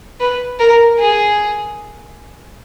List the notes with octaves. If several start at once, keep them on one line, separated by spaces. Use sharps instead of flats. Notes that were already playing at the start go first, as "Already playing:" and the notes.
B4
A#4
G#4